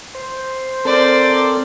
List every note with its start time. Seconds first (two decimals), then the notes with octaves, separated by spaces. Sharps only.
0.15 C5
0.85 C4 A4 A#4 C5 D5